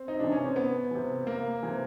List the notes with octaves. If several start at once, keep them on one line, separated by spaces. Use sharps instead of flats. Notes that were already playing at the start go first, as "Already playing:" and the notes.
Already playing: C4
D#4
C3 E3 D4
C#4
C4
B3
C3 E3
A#3
C3 E3